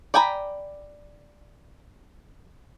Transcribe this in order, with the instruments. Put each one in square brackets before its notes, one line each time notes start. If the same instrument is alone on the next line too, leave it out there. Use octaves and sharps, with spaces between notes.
[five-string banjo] D5 G5 G#5 A#5 B5